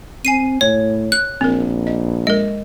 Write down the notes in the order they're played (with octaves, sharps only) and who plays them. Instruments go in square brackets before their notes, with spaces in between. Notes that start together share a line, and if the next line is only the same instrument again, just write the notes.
[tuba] C4 [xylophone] G#5 C7 D#7
[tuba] A2 [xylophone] C#5
[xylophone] F#6
[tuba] A#1 [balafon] C4 A#4
[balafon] D#5
[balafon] G#3 A#4 [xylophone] D#5